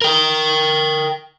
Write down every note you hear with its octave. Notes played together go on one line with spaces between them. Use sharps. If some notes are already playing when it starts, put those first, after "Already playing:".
A#4 G5